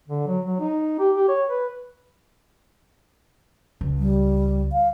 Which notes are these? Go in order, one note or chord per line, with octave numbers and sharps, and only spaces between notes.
D3
F#3
F#3
D#4
G4
G4
C#5
B4
C#2
G3
F5